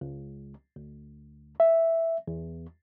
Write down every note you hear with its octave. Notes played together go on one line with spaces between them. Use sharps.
C#2
D2
E5
E2